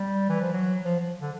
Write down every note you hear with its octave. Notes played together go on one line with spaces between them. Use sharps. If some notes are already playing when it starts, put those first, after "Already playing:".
Already playing: G3
E3
F3
F#3
F3
F3
D3